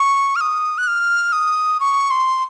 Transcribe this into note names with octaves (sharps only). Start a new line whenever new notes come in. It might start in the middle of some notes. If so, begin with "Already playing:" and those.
Already playing: C#6
F6
D#6
F#6
F6
D#6
C#6
C6